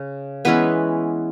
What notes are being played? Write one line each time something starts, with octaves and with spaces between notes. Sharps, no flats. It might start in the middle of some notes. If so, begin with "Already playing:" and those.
Already playing: C#3
E3 G#3 B3 C#4 E4 B4